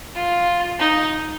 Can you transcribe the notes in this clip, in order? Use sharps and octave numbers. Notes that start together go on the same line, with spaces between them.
F4
D#4